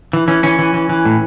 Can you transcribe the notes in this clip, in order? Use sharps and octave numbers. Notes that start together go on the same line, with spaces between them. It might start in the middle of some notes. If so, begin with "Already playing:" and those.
E3
E3 C#4
E3 C#4
E3
E3
E3
A2